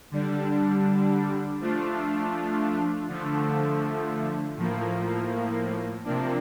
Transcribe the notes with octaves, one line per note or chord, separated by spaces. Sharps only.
D3 G3 D4
F3 A3 D4 F4
D3 F3 A3
A2 F3 A#3
C3 F3 A#3 D4